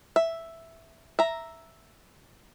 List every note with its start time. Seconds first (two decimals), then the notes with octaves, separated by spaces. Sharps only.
0.16 E5
1.19 E5 A#5